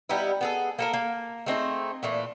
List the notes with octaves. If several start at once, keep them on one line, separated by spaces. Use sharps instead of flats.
G3 B3 D#4 E4
B3 G#4 A4
A#3 A4 A#4
A#3
A3 C4 D#4 G#4
A#2 E3 A3